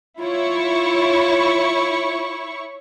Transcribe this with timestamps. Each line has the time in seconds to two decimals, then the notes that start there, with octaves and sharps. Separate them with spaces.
0.20 E4 F4 C#5 C#6